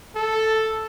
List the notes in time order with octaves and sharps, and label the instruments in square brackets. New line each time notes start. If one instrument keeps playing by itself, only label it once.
[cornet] A4